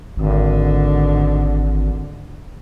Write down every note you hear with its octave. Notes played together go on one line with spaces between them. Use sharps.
G#1 G#2 D3